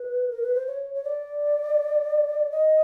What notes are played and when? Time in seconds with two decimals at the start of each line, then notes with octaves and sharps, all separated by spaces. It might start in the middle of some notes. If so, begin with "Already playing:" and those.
Already playing: B4
0.30 A#4
0.42 B4
0.54 C5
0.67 C#5
0.94 C#5
1.04 D5
2.51 D#5